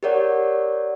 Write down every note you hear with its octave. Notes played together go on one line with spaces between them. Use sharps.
G4 A#4 C#5 D5 F#5